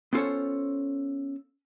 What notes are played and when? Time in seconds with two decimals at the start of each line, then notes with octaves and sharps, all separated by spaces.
0.13 B3 C#4 F4 A4 C5 C#5